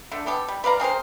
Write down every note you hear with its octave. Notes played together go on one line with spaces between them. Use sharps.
D3 A3
B3 G4 A4
G3
B4 D5 F5 A#5
C4 G#4 A#4 C5